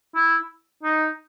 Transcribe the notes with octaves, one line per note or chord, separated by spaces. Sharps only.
E4
D#4